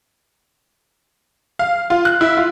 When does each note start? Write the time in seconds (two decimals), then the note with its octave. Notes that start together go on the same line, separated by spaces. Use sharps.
1.59 F5
1.90 F4
2.05 F#6
2.21 E4
2.37 F4